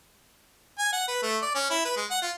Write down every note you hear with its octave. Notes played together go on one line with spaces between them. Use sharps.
G#5
F#5
B4
A3
D5
C#4
E4
B4
G#3
F#5
F4